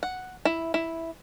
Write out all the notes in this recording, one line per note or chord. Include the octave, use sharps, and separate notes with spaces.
F#5
E4
E4